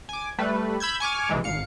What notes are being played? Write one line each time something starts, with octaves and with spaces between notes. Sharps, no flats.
G#5 D6
G3 A3 B4
B5 E6 G6 G#6
G#5 C#6 D6 F6
B1 C3 E3 G#3
G#1 F5 C#7